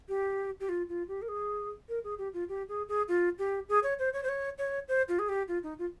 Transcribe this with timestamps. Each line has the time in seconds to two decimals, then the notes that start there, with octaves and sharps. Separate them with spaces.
0.09 G4
0.60 G4
0.69 F4
0.89 F4
1.08 G4
1.22 A#4
1.28 G#4
1.89 A#4
2.04 G#4
2.18 G4
2.34 F4
2.49 G4
2.69 G#4
2.88 G#4
3.08 F4
3.39 G4
3.69 G#4
3.83 C#5
3.99 C5
4.13 C#5
4.23 C5
4.29 C#5
4.58 C#5
4.88 C5
5.08 F4
5.19 G#4
5.29 G4
5.48 F4
5.63 D#4
5.79 F4